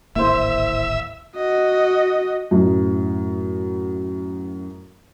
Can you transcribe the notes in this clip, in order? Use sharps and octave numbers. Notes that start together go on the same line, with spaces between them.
D1 G#1 A#3 E4 C5 E5
F#4 D#5
F#2 A2